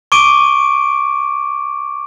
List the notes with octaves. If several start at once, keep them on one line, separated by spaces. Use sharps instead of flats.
C#6 D6 D7 D#7